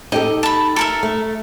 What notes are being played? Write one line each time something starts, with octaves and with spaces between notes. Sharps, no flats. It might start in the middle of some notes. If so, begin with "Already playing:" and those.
D#4 G4 A4 D#5
A5 B5
A4 A#4 E5
A3